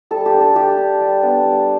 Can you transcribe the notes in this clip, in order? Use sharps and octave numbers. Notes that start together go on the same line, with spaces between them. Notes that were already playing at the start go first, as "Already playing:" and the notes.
G3 A4
G4
D4
A4
G3 G4
D4
G3
B3 D4
G3